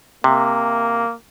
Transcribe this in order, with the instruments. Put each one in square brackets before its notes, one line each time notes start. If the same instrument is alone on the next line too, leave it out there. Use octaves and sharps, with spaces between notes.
[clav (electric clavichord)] C3 [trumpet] A#3